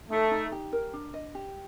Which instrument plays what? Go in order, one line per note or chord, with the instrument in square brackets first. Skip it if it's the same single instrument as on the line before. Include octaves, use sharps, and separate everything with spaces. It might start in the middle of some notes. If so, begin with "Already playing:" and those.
[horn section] A3 [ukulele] D#4
[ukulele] D#4
G4
A#4
D4
D#5
G4